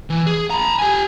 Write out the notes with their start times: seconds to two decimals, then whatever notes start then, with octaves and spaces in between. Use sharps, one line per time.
0.10 E3
0.27 G#4
0.50 A#5 B5
0.79 G4 G#5